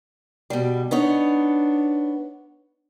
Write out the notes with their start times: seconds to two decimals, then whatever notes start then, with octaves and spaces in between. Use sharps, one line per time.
0.50 B2 G3
0.91 B3 D4 D#4 C#5